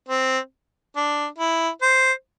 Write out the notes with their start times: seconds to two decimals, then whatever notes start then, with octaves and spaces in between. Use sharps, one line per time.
0.09 C4
0.96 D4
1.39 E4
1.82 C5